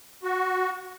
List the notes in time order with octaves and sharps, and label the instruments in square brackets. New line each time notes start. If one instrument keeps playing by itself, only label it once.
[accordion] F#4